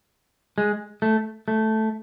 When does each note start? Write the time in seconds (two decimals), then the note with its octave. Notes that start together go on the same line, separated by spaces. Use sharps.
0.58 G#3
1.02 A3
1.48 A3